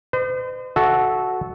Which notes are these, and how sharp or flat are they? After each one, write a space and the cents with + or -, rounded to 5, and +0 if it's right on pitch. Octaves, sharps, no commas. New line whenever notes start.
C5 -45 D#5 -40
F#4 +0 A4 -15 E5 +5